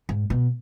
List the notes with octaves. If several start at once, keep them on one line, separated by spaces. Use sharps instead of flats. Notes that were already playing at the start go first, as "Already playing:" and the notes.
G#2
B2